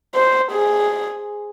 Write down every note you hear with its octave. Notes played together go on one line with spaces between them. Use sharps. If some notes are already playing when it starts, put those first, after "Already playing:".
C5
G#4